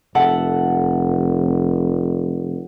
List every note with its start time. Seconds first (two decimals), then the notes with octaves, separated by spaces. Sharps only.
0.15 F1 A4 E5 F#5